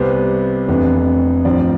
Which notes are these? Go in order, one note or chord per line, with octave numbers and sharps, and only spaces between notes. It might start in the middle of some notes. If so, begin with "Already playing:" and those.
Already playing: C2 C3 G3 B3 C5
F1 F2 E3 B3 D4
A1 G2 F3 C4 D5